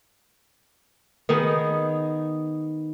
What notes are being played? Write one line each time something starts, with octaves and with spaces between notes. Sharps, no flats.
D#3 B3 D#4 G#4